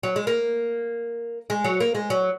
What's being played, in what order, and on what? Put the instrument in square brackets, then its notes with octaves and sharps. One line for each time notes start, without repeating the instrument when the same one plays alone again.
[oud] F#3
G#3
A#3
G#3
F#3
A#3
G#3
F#3